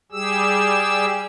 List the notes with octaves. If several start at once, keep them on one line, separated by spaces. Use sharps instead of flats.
G3 G4 G#4 E6